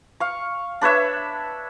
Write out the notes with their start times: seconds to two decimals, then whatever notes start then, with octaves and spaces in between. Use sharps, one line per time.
0.20 F5 C#6
0.81 D4 B4 C#5 E5